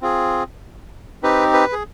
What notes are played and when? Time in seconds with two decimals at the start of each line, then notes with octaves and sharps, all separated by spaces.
0.01 C4 F4 G#4
1.23 C4 D#4 G4 B4
1.53 B4
1.72 G#4